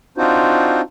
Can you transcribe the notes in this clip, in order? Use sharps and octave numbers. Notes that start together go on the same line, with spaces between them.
C4 D4 D#4 F4 F#4 C5